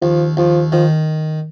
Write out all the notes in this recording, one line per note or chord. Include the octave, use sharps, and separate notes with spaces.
D#2 F3
D#2 F3
D#3 F3